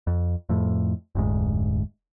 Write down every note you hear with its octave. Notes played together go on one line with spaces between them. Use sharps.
F2
F2 A2
F1 D2 G#2